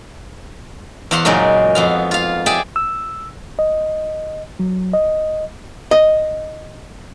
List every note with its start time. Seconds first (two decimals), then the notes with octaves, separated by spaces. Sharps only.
1.11 E2 C5 F5 F#5 C6
1.25 F#2 A#2 C#3 G#3 D#4
1.75 F2 B3 F5
2.11 F4 F5
2.46 G4 G#4 D5 E5
2.76 E6
3.59 D#5
4.59 F#3
4.93 D#5
5.91 D#5